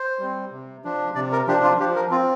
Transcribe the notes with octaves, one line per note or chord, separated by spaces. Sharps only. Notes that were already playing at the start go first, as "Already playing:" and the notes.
Already playing: C5
G3 C4
C3
F3 D4
C3 D5
A#4
F3 D4 G4
F4
F3 G4
A#4
C4 F4